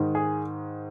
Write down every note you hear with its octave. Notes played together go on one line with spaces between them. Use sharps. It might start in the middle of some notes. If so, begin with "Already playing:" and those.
Already playing: G#2 D#3
G#4